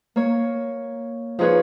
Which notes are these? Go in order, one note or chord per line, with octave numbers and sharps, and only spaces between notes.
A#3 C#5
F3 D#4 G#4 B4 C#5